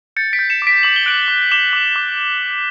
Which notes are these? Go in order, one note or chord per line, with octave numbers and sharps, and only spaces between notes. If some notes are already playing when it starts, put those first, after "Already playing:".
G6 A6 C#7
B6 D7
G6
C#7 E7
D6 B6 D7
D6 F#7
G7
F#6 D7 F#7
D6
D6 E7 G7
D6
D6